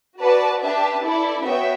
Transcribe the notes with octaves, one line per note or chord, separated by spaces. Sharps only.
F#4 B4 D5 A5
D4 G4 B4 E5 A5
E4 A4 D5
B3 F#4 C#5 E5 G5